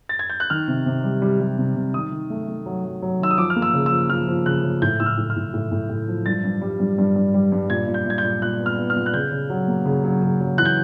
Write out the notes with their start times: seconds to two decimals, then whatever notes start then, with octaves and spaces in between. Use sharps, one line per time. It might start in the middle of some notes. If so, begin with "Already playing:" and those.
0.09 A6
0.19 G#6
0.30 G6
0.40 F#6
0.50 D#3 F6
0.68 C3
0.86 C3
1.04 G3
1.22 G3
1.40 G3
1.58 C3
1.76 C3
1.94 D#3 D#6
2.12 D#3
2.30 A3
2.48 A3
2.66 F#3
2.84 F#3
3.02 F#3
3.20 D#3 E6
3.31 D#6
3.38 F3 D6
3.50 F6
3.56 A#3
3.62 E6
3.74 C#3
3.86 E6
3.92 F3
4.10 F3 F6
4.28 F3
4.46 C#3 F#6
4.63 C#3
4.82 A2 G6
5.00 A2 E6
5.06 F6
5.18 A2
5.30 F6
5.36 A2
5.54 A2
5.72 A2
5.90 A2
6.08 F3
6.26 G2 A6
6.44 G2
6.61 G3
6.80 G2
6.98 G2
7.16 G2
7.34 G3
7.52 G2
7.70 A#2 G#6
7.88 A#2
7.94 G6
8.06 A#2 G#6
8.18 G6
8.24 A#2
8.42 A#2 F#6
8.60 B3
8.66 F6
8.78 B3
8.90 F6
8.96 A#2
9.06 F#6
9.14 C#3 G6
9.31 C#3
9.50 F#3
9.68 A#3
9.85 C#3
10.04 F#3
10.22 C#3
10.40 F#3
10.58 E3 F#6
10.65 G6